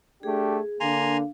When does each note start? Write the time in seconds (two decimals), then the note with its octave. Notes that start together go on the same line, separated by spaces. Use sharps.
0.23 A3 D4 G4 G#4
0.80 D3 A#3 D4 F5 G#5 A#5 C6